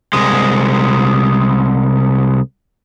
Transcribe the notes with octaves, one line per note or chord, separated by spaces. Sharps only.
C2 G#3